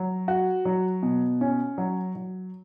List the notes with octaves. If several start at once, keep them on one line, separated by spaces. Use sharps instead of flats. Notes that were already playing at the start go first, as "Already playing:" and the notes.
Already playing: F#3
F#4
F#3
B2
C#4
F#3
F#3